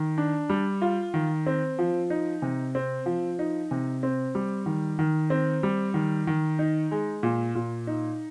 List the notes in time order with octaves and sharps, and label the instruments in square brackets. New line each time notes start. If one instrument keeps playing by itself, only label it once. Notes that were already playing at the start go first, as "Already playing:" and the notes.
Already playing: [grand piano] D#3
D4
G3
F4
D#3
C4
F3
D#4
C3
C4
F3
D#4
C3
C4
G3
D#3
D#3
C4
G3
D#3
D#3
D#4
G#3
A#2
A#2
D#4